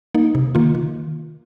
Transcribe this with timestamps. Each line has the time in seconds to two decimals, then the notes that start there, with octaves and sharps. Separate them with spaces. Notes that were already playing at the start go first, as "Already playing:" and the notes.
0.15 A#3 D#4
0.35 C3
0.55 D#3 A#3 F4
0.75 D#3